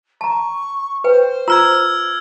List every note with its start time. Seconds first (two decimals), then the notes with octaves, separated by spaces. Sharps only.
0.21 A5 A#5 C#6
1.04 B4 C5 G5
1.48 F4 A#5 E6 F6 G#6